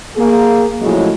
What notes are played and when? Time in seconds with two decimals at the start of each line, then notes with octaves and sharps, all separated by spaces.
0.17 A#3 G#4
0.82 A2 C#3 F3 F#3 G#3